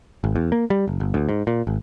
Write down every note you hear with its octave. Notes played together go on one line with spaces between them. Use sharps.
G#1
E2
A#3
G3
F#1
G1
D2
G#2
A#2
G#1